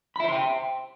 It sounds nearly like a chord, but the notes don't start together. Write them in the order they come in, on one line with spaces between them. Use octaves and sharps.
B5 E5 C5 C6 G5